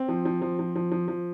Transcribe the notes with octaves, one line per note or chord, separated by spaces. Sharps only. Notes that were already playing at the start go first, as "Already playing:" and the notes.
Already playing: C4
F3
F3
F3
F3
F3
F3
F3